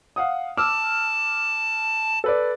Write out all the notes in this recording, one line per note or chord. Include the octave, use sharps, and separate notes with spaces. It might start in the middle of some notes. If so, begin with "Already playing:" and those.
F5 F#5 D#6
A5 D6 E6 F6
A4 B4 D5